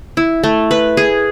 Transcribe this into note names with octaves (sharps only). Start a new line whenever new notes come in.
E4
A3
B4
G#4